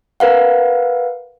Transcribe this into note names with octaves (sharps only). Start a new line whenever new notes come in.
A#4 B4 F5 F#5